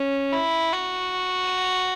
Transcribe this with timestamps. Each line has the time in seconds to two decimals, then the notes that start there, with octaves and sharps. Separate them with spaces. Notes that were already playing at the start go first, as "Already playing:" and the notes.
Already playing: C#4
0.32 E4
0.73 F#4